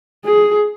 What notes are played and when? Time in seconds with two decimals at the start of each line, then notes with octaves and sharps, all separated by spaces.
0.24 G#4